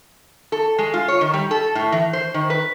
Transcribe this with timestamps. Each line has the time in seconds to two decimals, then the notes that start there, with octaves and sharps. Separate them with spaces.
0.52 A4
0.78 G#3
0.94 F4
1.08 C#5
1.21 D#3
1.34 G3
1.51 A4
1.75 A2
1.92 E3
2.13 C5
2.34 D#3
2.50 B4